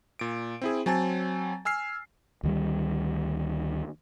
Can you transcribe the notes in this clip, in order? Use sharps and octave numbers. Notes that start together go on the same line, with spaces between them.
A#2 D7
C4 E4 G#4
F#3 C4 G#5 A5 A6
G#5 E6 F6 C7
D2 D#3 G3